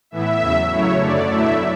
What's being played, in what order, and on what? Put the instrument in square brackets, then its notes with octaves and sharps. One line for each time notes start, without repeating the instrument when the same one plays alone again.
[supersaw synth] A2 E3 B3 E4 E5
E2 C#3 F#3
C#3 F#3 A3 E4 C#5
F#2 D3 A3 D4 D5
B2 F#3 A3 E4 E5